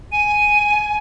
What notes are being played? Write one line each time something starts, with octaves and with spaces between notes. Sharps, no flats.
G#5 D#7